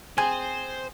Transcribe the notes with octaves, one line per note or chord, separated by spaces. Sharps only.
C4 G#4 C5 G#5